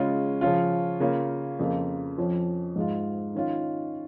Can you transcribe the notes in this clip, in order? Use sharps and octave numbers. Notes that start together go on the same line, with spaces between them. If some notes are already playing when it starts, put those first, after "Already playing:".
Already playing: C#3 G#3 C#4 F4
C#3 F3 C#4 F4
C#3 A#3 C#4 F4
F2 C#3 A#3 F4
F2 F3 C#4
G#2 G#3 F4
D#3 C#4 F4